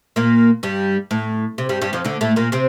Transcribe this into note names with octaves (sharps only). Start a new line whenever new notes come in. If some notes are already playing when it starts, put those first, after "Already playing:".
A#2 A#3
G2 G3
A2
C3
G2 G3
G2 G3
F2 F3
D2 D3
A2 A3
A#2 A#3
C3 C4